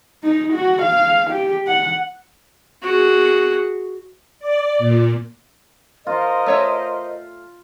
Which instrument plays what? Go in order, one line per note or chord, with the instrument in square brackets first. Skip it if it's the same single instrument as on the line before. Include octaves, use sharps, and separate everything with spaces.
[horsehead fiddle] D#4
F#4
F5
G4
F#5
[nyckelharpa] F#4 G#4
[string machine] D5
A#2
[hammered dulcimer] F4 [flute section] A#4 C5 D#5
[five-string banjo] A3 C#5 E5